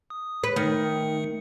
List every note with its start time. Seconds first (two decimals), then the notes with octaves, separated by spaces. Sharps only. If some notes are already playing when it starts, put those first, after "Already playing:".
0.10 D#6
0.44 B4
0.56 D#3 A3 C#7